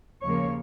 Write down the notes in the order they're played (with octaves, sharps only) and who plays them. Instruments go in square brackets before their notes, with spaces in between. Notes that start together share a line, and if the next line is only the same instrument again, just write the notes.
[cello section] D#2 C#3 F3 A#3 C#5